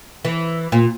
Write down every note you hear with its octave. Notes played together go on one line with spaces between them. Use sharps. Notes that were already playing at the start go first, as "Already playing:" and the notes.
E3
A#2